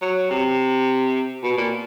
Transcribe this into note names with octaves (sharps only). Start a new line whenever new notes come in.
F#3
C3
B2
A#2